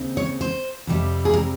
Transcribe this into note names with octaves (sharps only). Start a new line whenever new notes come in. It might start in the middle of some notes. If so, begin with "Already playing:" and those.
Already playing: D#2 C#3 C4 D#4
C#5
C5
F2 C3 G3
G#4
A#4